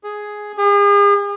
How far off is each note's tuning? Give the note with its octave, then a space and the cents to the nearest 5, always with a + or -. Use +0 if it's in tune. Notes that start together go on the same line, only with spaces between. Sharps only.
G#4 +5
G#4 -40